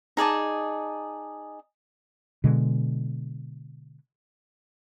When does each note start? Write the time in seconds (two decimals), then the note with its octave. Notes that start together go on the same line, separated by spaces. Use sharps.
0.17 D#4 G#4 D5 A5
2.44 B2 D3 G#3